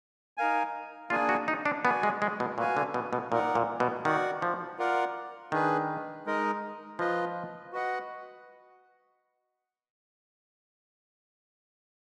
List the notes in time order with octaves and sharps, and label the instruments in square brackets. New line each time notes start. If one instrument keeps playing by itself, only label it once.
[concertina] D#4 A#4 F5 G#5
[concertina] A#3 D4 G#4 D5 G#5 [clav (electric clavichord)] F4
[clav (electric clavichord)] F#4
D#4
D4
[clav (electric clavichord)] B3 [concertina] F#4 D5 G#5
[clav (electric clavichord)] G#3
G#3
B2
[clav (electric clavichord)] A#2 [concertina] F#4 B4 F5 G#5
[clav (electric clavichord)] D3
B2
B2
[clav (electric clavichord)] A#2 [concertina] D#4 A#4 D5 F#5
[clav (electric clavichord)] A#2
B2
[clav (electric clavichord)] D#3 [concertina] F#4 D5 F#5
[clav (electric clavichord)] F3
[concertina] F4 A#4 D5 F#5
[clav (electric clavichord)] D#3 [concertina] D4 G#4 B4
[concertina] G#3 D#4 A#4 D#5
[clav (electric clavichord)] F3 [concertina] F4 B4 D#5
[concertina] F#4 B4 D#5 F#5